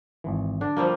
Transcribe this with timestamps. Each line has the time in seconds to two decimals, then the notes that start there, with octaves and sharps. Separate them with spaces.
0.24 G#1 E3
0.61 D3 D4
0.77 F3 G3 A#3